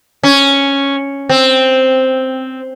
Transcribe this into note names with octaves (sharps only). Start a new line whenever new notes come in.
C#4
C4